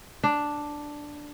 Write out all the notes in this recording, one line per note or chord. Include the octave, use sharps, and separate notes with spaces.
D4